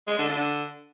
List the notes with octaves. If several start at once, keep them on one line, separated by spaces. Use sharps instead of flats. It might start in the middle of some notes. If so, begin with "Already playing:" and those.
G#3
D3
D3